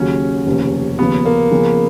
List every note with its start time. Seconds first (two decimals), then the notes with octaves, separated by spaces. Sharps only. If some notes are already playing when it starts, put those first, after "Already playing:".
Already playing: D#2 C#3 F#3 C#4
0.46 F1 D#2 C#3
0.99 D#2 C#3 F3 B3
1.25 A#3
1.51 C#3 F3 A#3 C#4 G#4